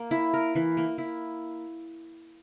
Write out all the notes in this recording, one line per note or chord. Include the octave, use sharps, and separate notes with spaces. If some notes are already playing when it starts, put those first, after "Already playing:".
Already playing: A#3
E4
A#4
E3
A#3
E4